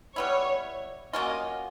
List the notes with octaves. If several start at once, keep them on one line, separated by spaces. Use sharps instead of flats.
G3 B3 E4 C#5
F#3 A#3 C#4 F4 D#5